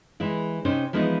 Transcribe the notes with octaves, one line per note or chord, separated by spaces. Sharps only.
E3 G#3 E4
C3 C#4 D#4 C5
E3 F3 G#3 B3 D#4